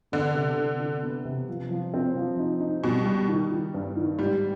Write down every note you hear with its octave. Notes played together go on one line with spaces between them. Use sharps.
D3 B3
C3
D4
D4
B3
C3
F3
F3
C4
F3
D#4
D#4
B2 G3
G3
D#3
D#3
G2
D#3
G#2 G3